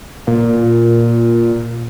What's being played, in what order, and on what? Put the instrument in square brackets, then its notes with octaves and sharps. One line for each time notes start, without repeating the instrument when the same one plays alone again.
[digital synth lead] A#2